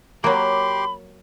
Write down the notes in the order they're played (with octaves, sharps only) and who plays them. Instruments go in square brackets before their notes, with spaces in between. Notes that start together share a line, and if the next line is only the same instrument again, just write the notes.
[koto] F#3 A#3 [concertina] G4 C6 D6 [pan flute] B5